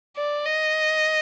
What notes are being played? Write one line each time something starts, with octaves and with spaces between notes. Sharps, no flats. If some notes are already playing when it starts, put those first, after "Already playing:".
D5
D#5